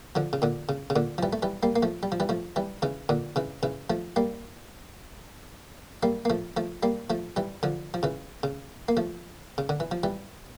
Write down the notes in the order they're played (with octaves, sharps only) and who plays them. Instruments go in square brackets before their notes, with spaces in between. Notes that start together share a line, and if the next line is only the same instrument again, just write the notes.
[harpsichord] D3 F3
C#3
A#2 D3
C#3
C#3
A#2 D3
F3
E3 G3
A3
E3 G3
G3 A#3
A#3
F3 A3
G3
F3
E3 G3
F3 A3
E3 G3
C#3 E3
A#2 D3
C#3 E3
C#3 E3
F3 A3
G3 A#3
G3 A#3
A#3
F3 A3
F3 A3
G3 A#3
F3 A3
E3 G3
D3 F3
F3
C#3 E3
C#3
A#3
F3 A3
C#3
D3
E3
F3
E3 G3